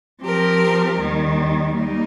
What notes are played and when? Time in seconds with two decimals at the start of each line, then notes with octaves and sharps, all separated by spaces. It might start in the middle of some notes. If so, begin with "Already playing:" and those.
0.21 F3 C4 G4 A#4
0.97 D#2 D#3 G3
1.73 G3 A#3 D#4